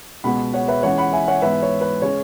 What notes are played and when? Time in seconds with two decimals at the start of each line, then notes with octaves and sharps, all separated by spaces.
0.24 C#2 B2 G#3 B3 F#5 B5
0.54 C#5 F#5
0.68 B4 E5
0.83 C#2 C#3 E3 C#5 F#5
0.98 F#5 B5
1.12 E5 G#5
1.28 C#5 F#5
1.42 G#2 E3 B3 B4 E5
1.62 C#5
1.81 B4
2.02 C#3 G#3 C#5